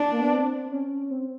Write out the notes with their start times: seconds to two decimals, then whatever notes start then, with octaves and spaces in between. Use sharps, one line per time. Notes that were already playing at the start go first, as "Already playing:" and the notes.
Already playing: D4
0.12 A#3
0.20 B3
0.33 C4
0.72 C#4
1.10 C4
1.21 C4